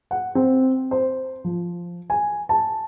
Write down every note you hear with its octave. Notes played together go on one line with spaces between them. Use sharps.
F#5
C4
C5
F3
G#5
A5